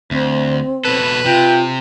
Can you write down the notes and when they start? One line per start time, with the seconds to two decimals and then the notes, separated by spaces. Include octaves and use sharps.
0.11 D2 C4
0.85 B2 A4 B4
1.26 C3 F4 G5